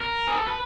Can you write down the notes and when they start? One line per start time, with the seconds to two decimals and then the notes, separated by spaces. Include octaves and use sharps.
0.01 A#4
0.28 G#4
0.35 A4
0.47 B4